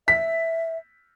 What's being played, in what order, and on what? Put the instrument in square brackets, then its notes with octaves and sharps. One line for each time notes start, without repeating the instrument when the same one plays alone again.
[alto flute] E5 [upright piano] B6